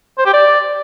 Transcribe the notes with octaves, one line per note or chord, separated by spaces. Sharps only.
C5
G4
D5